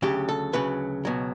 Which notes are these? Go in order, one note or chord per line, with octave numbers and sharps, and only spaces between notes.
D2 C#3 F#3 G4
A4
D2 C#3 F#3 B4
C#2 B2 F#3